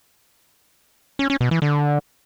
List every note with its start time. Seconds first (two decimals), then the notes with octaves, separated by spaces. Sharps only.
1.19 C#4
1.30 C#4
1.41 B2
1.51 E3
1.62 D3